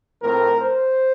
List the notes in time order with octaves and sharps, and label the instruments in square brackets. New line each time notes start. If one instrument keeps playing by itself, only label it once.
[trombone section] A2 F3 A3 C4 A#4
C5